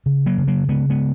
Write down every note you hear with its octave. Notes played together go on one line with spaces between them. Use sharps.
C#3
F#3 A#3
C#3
F#3 A#3
C#3 G#3 B3
G#3 B3